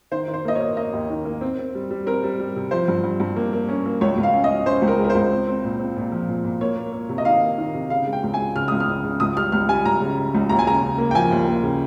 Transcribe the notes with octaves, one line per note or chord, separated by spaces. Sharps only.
D#3 C5
D#3
C5
A#3 D#5
C#5
A#3
A#3 D#5
D#2
D#3
A#3
C4
C4
G3
G3
C4 A#4
G3
G3
C3
F3 C5
G2
G2
G2
A#3
A#3
C#4
A#3
C#2 C#5
C#2
F5
C#4
D#5
C#4
C#4 C5
C#2
A#4
G#3
A#4
C5
C#2
C4
C4
A#2
C4
A#2
F3
A#2
A#2
A#3 C#5
A#3
A#3
C3
D#5
D#3 F5
A#3
D#3
C3
C#3 F5
G#3
G5
C#2
G#5
G#3
C#3 F6
C#2 D#6
F6
C#3
C#3
C#2 D#6
G3 F6
C#2 F6
G3 G#5
C#2 A#5
C#3
C#3
C#2
D#2 A#5
G#5
C#3 A#5
C#3
A#3
G5
F3 G#5
D#2
A#3
C#3